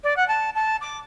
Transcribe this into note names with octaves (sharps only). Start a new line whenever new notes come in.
D5
F#5
A5
A5
D6